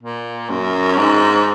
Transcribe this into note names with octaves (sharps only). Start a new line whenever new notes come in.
A#2
F#2
G#2